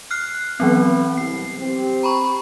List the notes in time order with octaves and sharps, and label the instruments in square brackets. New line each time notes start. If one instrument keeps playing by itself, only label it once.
[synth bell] F6 F#6 C7
[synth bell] E3 F#3 C4 [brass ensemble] B3
[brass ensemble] C2 [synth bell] C7
[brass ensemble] C4 G4
[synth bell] A#5 B5 C#6